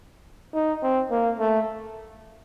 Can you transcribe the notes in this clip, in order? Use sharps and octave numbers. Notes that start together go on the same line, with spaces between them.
D#4
C4
A#3
A3